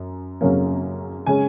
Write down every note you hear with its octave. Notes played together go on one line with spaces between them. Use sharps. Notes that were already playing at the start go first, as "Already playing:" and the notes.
Already playing: F#2
F#2 C#3 F#3 A#3 C#4
C#3 G#3 C#4 G#5